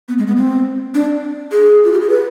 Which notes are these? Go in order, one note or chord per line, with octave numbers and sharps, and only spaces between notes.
B3
G#3
B3
C4
D4
G#4
F4
G4
G#4
B4